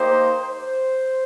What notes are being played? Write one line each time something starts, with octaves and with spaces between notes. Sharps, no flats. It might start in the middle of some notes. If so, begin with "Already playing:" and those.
Already playing: A#3 D#4 G4 C5
C5